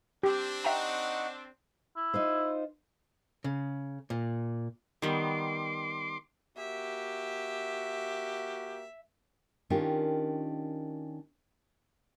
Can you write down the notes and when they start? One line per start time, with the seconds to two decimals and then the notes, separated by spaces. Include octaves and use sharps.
0.23 C4 D4 G4
0.64 D#4 E5 F#5 G5 A#5 C#6
1.96 E4
2.14 D#4 F4 C5
3.44 C#3
4.10 A#2
5.02 D#3 G3 B3 C6 D6
6.57 A#3 F#4 G4 E5
9.70 D#3 C#4 D4 F4 G4 A#4